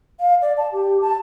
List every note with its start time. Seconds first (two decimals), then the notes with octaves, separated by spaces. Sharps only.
0.20 F5
0.42 D5
0.58 A5
0.72 G4
1.01 A5